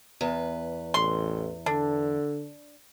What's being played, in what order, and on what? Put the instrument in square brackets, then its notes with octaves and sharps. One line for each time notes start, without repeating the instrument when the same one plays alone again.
[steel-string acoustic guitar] E2 B4
[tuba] A1 [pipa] C6
[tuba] D3 [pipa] D4